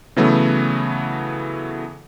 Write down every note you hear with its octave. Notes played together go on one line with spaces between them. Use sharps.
C#3 E3 F#3 A3 B3